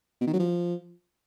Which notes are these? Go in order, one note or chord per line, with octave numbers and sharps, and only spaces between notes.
B2
D#3
F#3
F3